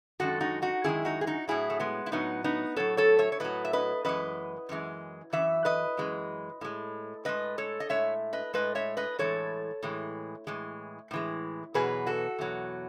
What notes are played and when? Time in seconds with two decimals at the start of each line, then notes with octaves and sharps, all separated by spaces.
0.20 F#2 D#3 G#3 F#4 A4
0.41 D#4 F#4
0.62 D#4 F#4
0.84 F#2 D#3 G#3 E4 G#4
1.05 D#4 F#4
1.21 G#4
1.27 D#4 F#4
1.48 A2 F#3 E4 G#4
1.70 A3
1.80 G#3 B3
2.06 E4
2.12 A2 F#3 B3 D#4
2.44 B3 D#4
2.76 A2 F#3 A4 C#5
2.97 A4 C#5
3.19 C#5 E5
3.32 C#5
3.40 A2 F#3 B4 D#5
3.65 E5
3.73 B4 D#5
4.05 F#2 E3 G#3 B4 D#5
4.69 F#2 E3 G#3
5.33 F#2 E3 E5
5.65 B4 D#5
5.97 F#2 E3 G#3
6.61 A2 G#3
7.25 A2 G#3 B4 D#5
7.58 A4 C#5
7.80 D#5
7.89 A2 G#3 C#5 E5
8.33 B4 D#5
8.54 A2 G#3 B4 D#5
8.75 C#5 E5
8.97 B4 D#5
9.19 A2 E3 G#3 A4 C#5
9.83 A2 E3 G#3
10.47 A2 E3 G#3
11.11 A2 E3 G#3
11.74 E2 B2 F#3 G#4 B4
12.07 F#4 A4
12.39 E2 B2 F#3